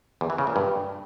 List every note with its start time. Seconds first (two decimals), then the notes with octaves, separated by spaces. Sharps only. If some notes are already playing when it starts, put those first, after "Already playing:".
0.21 E2
0.30 E3
0.38 C#3
0.47 A#2
0.56 G2